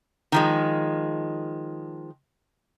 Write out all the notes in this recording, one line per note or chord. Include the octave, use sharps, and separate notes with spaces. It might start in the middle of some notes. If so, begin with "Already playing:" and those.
D#3 F3 G#3